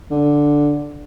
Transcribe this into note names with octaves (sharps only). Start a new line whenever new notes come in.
D3